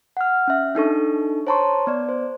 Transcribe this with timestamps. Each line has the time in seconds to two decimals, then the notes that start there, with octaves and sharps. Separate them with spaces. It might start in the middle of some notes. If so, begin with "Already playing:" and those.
0.17 F#5 F6
0.48 C#4 E5
0.75 D4 D#4 A4 C#6
1.47 C5 C#5 A5 A#5 C6 C#6
1.87 B3 D5
2.09 C5